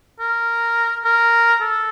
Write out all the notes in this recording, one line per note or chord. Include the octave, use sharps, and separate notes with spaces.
A#4
A#4
A4